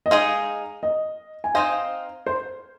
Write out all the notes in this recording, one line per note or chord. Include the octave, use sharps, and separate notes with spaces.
D#5
G#3 D#4 G#4 F5
D#5
G#5
C4 D#4 C5 D#5 F5
C5